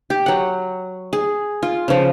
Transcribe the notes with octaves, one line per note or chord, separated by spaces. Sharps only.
G4
F#3 F#5
G#4
F4
C#3 F3